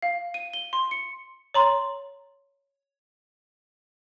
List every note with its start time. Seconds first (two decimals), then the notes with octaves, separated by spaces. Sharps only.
0.03 F5
0.34 D#7
0.53 G7
0.73 C6
0.91 C#7
1.54 C#5 A#5 C6